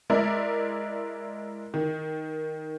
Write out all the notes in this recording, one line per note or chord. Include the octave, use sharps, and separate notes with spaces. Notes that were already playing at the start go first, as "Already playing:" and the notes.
G#3 E4 A#4 D5 E5
D#3